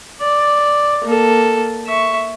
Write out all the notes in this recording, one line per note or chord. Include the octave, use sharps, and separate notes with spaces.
D5
A#3 A4
E5 C#6